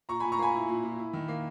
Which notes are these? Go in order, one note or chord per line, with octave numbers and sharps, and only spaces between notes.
A#2 A#5 C#6
A#2 G#5 B5
A#5 C#6
A#3 G#5 B5
E4
A#2
A#2
E4
D#3
A#3